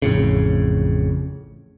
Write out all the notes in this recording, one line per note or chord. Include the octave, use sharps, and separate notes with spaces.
A1 F2 A2 C#3